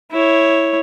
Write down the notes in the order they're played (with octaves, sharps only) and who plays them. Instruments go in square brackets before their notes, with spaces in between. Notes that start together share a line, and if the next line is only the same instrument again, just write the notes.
[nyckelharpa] E4 C#5